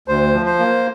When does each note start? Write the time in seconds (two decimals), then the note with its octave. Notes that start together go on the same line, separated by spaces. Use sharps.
0.08 D2 C5
0.34 F3
0.46 C5
0.59 A#3